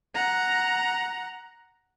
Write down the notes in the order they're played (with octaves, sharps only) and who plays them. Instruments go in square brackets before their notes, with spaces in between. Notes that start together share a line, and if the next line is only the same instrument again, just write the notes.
[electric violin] F#5 A#5